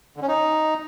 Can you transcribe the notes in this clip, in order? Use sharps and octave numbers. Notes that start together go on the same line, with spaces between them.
D3
C#4
D#4